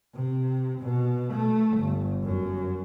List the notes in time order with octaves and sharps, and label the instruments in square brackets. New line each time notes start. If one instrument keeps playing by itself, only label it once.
[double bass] C3
B2
A3
G1
F#2